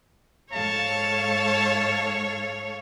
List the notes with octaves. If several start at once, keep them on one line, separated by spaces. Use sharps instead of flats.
G#2 A4 C#5 F5 A5